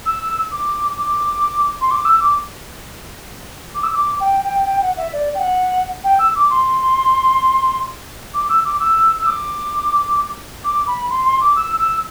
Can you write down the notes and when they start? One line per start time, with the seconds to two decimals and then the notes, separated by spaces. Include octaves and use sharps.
0.06 E6
0.52 D6
0.98 D6
1.81 C6
1.91 D6
2.05 E6
2.20 D6
3.75 D6
3.83 E6
3.93 D6
4.20 G5
4.44 G5
4.66 G5
4.82 F#5
4.97 E5
5.13 D5
5.34 G5
5.39 F#5
6.04 G5
6.19 E6
6.35 D6
6.50 C6
8.34 D6
8.49 E6
8.65 D6
8.80 E6
9.21 E6
9.26 D6
10.64 D6
10.87 B5
11.10 C6
11.25 C6
11.41 D6
11.56 E6
11.79 E6